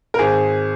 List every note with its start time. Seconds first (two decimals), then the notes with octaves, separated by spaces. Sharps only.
0.14 A#4
0.19 G#1 G#4